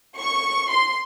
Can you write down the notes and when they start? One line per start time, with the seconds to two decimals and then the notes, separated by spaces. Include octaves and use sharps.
0.19 C#6
0.71 C6